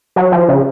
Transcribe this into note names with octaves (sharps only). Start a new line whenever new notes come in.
F#3
F3
C#3